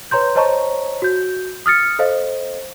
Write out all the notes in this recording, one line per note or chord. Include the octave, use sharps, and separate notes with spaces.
B4 C#5 A#5 C6 G6
C5 C#5 D#5 A5 A#5 C#6
F#4 G6
D#6 F6 A6 C#7
A4 C5 D#5 F5